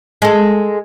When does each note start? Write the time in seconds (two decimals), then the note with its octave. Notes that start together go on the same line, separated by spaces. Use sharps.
0.22 G#3 A4